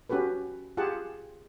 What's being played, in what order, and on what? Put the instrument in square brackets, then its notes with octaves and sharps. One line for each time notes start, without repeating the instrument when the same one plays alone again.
[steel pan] C#4 F#4 G4 A4 B4
F4 G4 G#4 F#5 A5